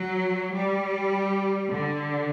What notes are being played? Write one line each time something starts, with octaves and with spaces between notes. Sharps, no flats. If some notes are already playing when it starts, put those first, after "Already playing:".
Already playing: F#3
G3
D3